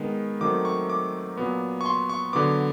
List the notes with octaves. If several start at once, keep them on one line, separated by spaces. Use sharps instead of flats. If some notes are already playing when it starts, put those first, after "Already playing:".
Already playing: D#3 G#3 B3
D#3 F#3 A3 C4 D6
C#6
D6
A#2 F#3 B3
C#6
C6
C#6
D3 F#3 B3 D6